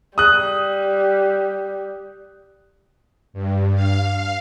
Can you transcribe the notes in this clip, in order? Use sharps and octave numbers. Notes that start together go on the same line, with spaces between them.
G3 D#6 F#6
G2
F5